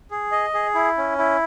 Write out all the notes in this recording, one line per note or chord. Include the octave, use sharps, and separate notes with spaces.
G#4
D#5
G#4
E4
C#4
E4